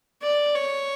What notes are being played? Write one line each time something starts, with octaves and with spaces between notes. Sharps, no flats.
D5
C#5